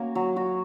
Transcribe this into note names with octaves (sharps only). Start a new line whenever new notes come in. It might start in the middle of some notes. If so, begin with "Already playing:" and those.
Already playing: A#3 C#4 F#4
F#3
F#4